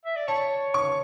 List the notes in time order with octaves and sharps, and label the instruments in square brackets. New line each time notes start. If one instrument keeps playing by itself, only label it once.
[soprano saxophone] E5
D5
[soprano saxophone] C#5 [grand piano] A5
[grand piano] C#6